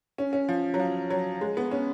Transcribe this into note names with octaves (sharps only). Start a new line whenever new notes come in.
C#4
C#4
F3
F#3
F3
F#3
G#3
B3
C#4